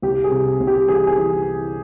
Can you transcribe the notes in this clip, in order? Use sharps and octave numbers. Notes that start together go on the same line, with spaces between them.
C2 G4
G#4
C3
C2
G4
E3 G#4
G#4
E3